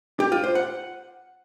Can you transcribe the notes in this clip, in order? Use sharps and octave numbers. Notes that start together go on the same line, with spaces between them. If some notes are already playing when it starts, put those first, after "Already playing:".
G4
F4
C5
F#5